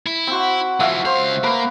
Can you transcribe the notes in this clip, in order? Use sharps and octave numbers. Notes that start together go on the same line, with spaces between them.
E4
C4 F#4
F3 E4 F#4 E5 F5
C#2 C5 F5
A#3 B4